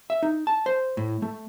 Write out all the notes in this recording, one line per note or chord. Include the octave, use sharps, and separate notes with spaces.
E5
D#4
A5
C5
A2
A3